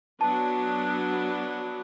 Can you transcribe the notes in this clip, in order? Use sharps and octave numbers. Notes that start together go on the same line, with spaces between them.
F#3 B3 D4 A5